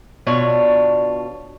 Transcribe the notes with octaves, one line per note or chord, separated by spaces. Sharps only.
B2 D4 F4 C#5